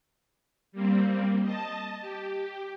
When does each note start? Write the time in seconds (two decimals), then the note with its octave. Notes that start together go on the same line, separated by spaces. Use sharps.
0.72 G3 A#3 C4
1.42 D#5 A5
2.01 G4